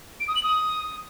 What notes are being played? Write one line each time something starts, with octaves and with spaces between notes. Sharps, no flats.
D7
D#6
F#7
D#6